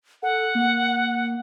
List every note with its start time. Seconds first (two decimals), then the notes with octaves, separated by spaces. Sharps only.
0.23 A4 F#5
0.55 A#3